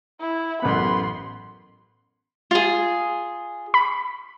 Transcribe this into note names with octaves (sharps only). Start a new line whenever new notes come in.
E4
A1 F#2 B3 B5 C6
F4 G#4
B5